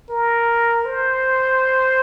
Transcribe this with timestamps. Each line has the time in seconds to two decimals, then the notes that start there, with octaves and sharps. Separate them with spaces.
0.09 A#4
0.85 C5